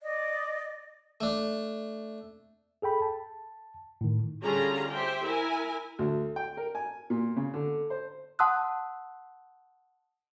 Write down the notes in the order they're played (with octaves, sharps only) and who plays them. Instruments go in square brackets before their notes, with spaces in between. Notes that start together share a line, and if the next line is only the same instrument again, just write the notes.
[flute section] D5 D#5
[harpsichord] A3 D4
[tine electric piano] G#4 A4 G5 B5
A5
A2 D#3
[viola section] D3 G3 C#4 F4 G#4 A#5
G4 C5 E5 G5
E4 A#4 G#5
[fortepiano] D2
G5
A#4
G#5
A#2
C#3
D3
C5
[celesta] F#5 A5 C6 D#6 E6 F#6